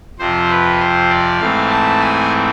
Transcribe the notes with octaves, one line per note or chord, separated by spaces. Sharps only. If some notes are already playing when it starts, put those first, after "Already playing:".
F2 C3 F3 C5
B4
C5
D5
G#2 E3 A3 C4 F5
A5
G#5